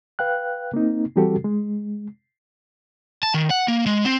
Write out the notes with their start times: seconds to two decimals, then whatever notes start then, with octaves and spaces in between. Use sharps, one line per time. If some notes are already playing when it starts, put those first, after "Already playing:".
0.19 B4 F5 G5 F#6
0.74 A#3 C4 D#4
1.16 E3 G3 C4 F#4 G4 A4
1.44 G#3
3.23 A5
3.34 D#3
3.50 F#5
3.68 A#3
3.86 G#3
4.05 C4